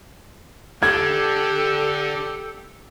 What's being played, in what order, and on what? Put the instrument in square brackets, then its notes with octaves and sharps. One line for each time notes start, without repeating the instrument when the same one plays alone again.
[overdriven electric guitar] D3 D4 [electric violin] G4 [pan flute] A4 [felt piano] G#6